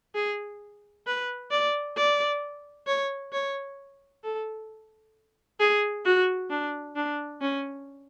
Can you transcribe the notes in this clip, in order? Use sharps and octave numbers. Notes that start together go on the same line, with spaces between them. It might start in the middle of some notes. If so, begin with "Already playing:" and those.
G#4
B4
D5
D5
C#5
C#5
A4
G#4
F#4
D4
D4
C#4